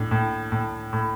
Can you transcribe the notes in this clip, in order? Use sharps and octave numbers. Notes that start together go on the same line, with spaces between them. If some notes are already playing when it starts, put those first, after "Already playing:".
Already playing: A2 D4
A2
A2
A2